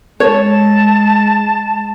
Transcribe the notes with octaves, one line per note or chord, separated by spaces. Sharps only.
G#3 C#5 A5